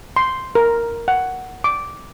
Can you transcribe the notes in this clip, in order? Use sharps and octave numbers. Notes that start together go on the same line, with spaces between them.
C6
A#4
F#5
D6